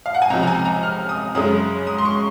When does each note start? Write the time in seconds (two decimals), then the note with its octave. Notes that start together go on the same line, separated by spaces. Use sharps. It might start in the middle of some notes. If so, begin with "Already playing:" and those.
0.06 F5
0.15 F#5
0.22 G#5
0.30 C#2 C3 F3 A#5
0.43 A#5
0.47 G#5
0.65 A#5
0.83 F6
1.09 D#6
1.35 F#2 C#3 G#3 C#4 D#6
1.87 D#6
1.98 C6
2.05 C#6